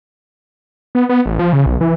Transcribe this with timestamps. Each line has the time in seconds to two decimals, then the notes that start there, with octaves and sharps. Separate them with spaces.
0.95 B3
1.09 B3
1.26 A1
1.39 F3
1.53 C#3
1.66 B1
1.81 E3